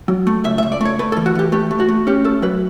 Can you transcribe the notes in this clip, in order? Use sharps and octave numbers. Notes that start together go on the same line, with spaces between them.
F#3
A3
C#2 E5
E5
C#2
D5
A3 C#5
A3 B4
A4
E3
F#4
E3 G4
A3 G4
A3
F#4
A3
C#4 G4
A3 A4
F#3 B4